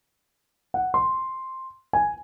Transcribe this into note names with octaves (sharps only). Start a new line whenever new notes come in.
F#5
C6
G#5